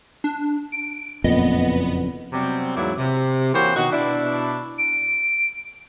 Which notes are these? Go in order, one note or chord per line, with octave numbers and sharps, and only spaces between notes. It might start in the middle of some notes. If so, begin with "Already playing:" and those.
D4
D7
F#1 F2 A#2 B3 D#5
C3 F#3 G3 B3 C4
E2 G#2 F#3 A#3 E4 D5
C3
E3 A#3 F#4 G4 C5 C#5
B2 D#3 F#4
B2 D4 E4
D7